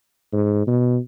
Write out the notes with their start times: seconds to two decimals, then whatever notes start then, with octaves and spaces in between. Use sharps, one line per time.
0.33 G#2
0.67 B2